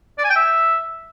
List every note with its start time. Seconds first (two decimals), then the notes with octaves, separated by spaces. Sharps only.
0.18 D5
0.24 G#5
0.30 G5
0.35 E5